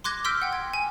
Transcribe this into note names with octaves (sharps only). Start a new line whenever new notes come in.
C6 D6 F#6 G#6 A#6
C6 E6 F6 G6 B6 D7
F#5 G5
G#6
G#5